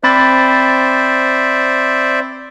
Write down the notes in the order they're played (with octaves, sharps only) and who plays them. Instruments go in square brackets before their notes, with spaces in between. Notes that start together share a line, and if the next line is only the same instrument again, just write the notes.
[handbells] C4 B5 A6 [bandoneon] C5 D5 E5